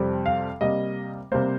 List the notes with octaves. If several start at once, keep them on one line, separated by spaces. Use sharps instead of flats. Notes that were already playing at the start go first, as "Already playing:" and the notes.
Already playing: F2 C3 G3 C4
F5
C3 G3 A#3 D#5
C3 G3 A#3 C5